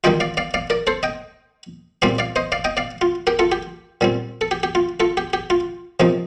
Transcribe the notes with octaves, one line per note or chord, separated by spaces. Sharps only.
D#3 G3 D4 F4 D#5 G5
D5 F5
D5 F5
D5 F5
A#4 D5
A4 C5
D#5 G5
A#2 G3 C4 F4 D5 F5
D5 F5
C5 D#5
D5 F5
D#5 G5
D5 F5
F4
G4 A#4
F4 A4
G4
A#2 G3 C4
A4
G4
G4
F4
F4 A4
G4
G4
F4
C3 F3 A#3 D#4